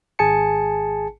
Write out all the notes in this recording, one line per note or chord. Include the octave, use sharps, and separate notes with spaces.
G#1 G#4 G#5 A5 C#7